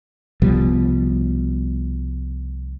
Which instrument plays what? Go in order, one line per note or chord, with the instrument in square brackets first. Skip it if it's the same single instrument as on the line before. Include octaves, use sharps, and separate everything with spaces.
[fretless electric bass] C2 B2 F3 G3